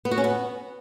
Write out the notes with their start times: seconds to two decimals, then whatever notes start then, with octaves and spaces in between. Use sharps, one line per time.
0.05 B3
0.11 F#4
0.18 C#4
0.24 B3